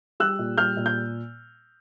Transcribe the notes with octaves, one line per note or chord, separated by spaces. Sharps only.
G3 E6 F#6
A#2
G3 F6 G6
A#2
G6